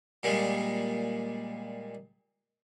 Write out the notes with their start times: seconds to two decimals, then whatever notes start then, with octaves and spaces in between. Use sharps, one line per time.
0.23 A#2 G3 G#3